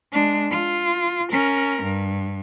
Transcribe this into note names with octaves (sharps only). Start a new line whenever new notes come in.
G#3 D4
F4
C#4 A#4
G2